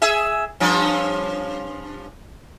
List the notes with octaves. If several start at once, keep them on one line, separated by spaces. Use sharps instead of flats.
G#4 E5
G2 F3 C#4